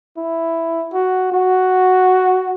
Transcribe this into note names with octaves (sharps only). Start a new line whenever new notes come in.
E4
F#4
F#4